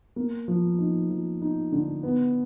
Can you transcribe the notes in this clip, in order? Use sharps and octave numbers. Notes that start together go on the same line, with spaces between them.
A#3
F3
D#4
F3
D#4
D3
B3